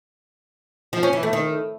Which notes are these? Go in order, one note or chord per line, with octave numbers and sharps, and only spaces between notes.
F3
C#4
E3
A3
D#3